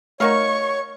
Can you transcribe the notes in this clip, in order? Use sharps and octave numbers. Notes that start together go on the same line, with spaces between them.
A3 D#4 F#4 A#4 C#5 F5 C#6